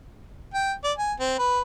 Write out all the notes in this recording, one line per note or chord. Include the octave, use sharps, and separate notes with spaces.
G5
D5
G#5
C4
B4